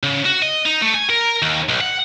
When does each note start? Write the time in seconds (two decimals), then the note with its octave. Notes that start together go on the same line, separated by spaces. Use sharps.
0.03 C#3
0.25 F#4
0.42 D#5
0.66 D#4
0.82 A3
0.94 G#5
1.10 A#4
1.42 D#2
1.69 B1
1.81 F#5